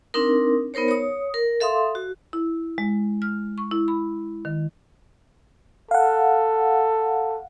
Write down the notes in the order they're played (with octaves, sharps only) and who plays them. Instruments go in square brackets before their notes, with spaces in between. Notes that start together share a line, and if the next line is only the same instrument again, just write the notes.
[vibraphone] C4 D4 D#4 A#4
B3 D#4 A#4 C5 C#5
C#5 D#6
A#4
A4 E5 F5 C6 D#6
F#4
[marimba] E4
G#3
F6
C#6
E4
B5
D#3
[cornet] A4 [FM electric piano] F5 F#5